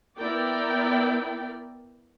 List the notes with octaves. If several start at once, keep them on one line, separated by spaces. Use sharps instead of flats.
B3 E4 A#4 D5 G5